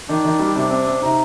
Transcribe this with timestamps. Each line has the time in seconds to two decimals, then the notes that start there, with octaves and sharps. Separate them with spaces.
0.09 D#3 D4
0.24 D#3
0.39 G3
0.55 C3
0.71 C4
0.87 C4
1.02 C3 D#4